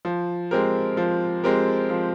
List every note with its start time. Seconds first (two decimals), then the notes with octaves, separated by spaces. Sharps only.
0.05 F3
0.51 G#3 C4 G4 A#4
0.97 F3
1.44 G#3 C4 G4 A#4
1.90 F3